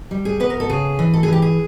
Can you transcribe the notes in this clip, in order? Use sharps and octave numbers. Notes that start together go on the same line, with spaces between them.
G3
G#4
B3 B4
A#4
A4
C#3 G#4
E3
A4
G#4
E3 G4
G#4